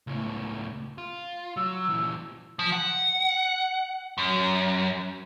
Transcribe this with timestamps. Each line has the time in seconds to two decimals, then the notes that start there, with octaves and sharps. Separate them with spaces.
0.07 C#2 A2
0.98 F4
1.57 F#3 E6
1.89 A#2 E3
2.59 F3
2.72 F#5
4.18 F#2